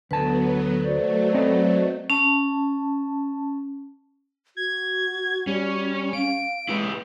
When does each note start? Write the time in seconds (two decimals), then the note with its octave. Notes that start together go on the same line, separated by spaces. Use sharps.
0.11 D2 F#3 B3 A4 B4 A5
0.84 F#3 A3 F#4 C5 D5
1.34 C4 D#5
2.10 C#4 A5
4.57 F#4 G#6
5.47 G3 C#4
6.13 F5 D7
6.69 G#3 E4 G4 B4